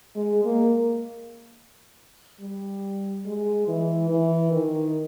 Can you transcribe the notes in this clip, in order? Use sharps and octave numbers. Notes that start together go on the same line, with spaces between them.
G#3
A#3
G3
G#3
E3
E3
D#3